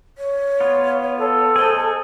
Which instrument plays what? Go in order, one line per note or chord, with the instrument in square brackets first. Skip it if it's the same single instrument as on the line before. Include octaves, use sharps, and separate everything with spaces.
[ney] C#5
[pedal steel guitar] B3 F4
[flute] A4
[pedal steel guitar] G#4 D#5 [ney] C5